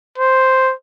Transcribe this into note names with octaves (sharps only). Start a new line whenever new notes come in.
C5